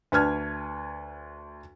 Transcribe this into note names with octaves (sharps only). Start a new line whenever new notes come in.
D2 B4 A5 F6 G#6